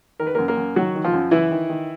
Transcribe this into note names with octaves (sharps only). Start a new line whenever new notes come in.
D#3 A#4
B4
F#2 A#3 A#4
A#3 A#4
F#2
D#3 F#3 F#4
D#3
F3 F4
F#2
F#2 E3 E4
D#3
D#3